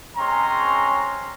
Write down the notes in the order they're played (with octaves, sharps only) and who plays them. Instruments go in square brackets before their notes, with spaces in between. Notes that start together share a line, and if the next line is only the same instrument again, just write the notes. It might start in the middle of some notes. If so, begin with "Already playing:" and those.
[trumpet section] G#3 C4 C#4 A#5 C6